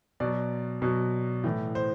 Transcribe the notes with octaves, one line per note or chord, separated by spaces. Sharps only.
B2 F#3 D5
B2 F#3
A2 E3
C5